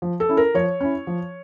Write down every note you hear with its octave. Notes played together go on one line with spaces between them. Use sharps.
F3
A4
C#4 E4
A#4
F3 C#5
C#4 E4
F3